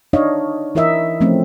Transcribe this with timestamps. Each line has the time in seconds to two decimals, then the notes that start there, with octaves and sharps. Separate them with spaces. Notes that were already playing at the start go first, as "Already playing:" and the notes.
0.13 D4 D#4 C#5 D#5 F5
0.75 E3 E4 A#4 D#5 E5
1.21 F3 A3 C4 C#4